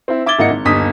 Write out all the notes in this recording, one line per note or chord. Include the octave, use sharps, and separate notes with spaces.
C4 E4
E5 D6 G#6 A6 G7
G#1 A#3 E4 D#5 F#5 C#7
G#1
G1 D#2 D#4 D#6 B6